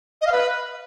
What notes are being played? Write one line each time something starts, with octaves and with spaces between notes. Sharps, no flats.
D#5
F5
B4